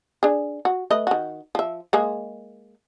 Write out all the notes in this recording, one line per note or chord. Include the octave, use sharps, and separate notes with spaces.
D4 G#4
F#4
A3 B4 D#5
D#3 F#4
F3 E5
G#3 A#3 G#4